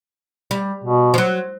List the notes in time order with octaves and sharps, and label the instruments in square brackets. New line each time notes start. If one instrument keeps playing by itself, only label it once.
[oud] G3
[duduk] B2
[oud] F3
F#3